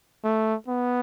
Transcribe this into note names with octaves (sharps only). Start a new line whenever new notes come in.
A3
B3